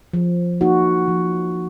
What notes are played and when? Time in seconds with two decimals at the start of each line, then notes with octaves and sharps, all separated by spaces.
0.13 F3
0.61 A#3 D#4 F#4
1.08 F3